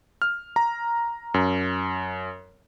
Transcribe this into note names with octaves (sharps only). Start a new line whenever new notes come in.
F6
A#5
F#2